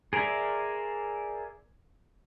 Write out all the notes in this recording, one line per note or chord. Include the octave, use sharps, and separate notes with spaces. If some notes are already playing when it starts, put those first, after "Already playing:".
G#4 A#4 C5 D5 E5